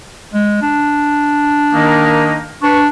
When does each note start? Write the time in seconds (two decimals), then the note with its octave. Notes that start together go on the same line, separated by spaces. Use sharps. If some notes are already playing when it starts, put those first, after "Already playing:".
0.34 G#3
0.62 D4
1.72 D#3 A#3 D#4
2.62 D4 B4 C#6